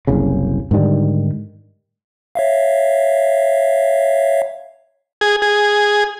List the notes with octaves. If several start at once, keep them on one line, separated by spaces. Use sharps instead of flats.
F#1 C2 C#3
G#2 D3 D#3 G3
C#5 E5 F5
G#4
G#4